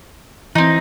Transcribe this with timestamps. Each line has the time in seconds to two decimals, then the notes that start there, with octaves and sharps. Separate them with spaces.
0.55 E3 C4 D#4